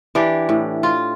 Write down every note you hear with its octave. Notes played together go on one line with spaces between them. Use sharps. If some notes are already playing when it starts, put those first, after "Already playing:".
E3 D4 G4
A2
F4